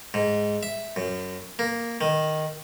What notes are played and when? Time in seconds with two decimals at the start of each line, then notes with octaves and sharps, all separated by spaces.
0.14 G#2
0.63 E5
0.96 F#2
1.59 A#3
2.01 D#3